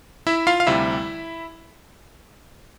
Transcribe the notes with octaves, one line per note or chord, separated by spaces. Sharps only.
E4 E5
F4 F5
F5
D2 C3 G3 E4 E5